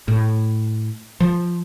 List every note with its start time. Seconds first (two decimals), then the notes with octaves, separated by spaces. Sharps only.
0.08 A2
1.20 F3